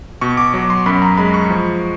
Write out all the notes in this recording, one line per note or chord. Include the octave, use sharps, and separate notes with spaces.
B2 C#6
D6
F#3
C6
F#2 B5
A#5
G#3 B5
C#6
F3